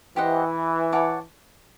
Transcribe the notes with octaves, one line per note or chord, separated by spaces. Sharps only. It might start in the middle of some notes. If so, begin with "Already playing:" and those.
E3 G4 C5 D#5 F#5
C#5 F#5 A5 D6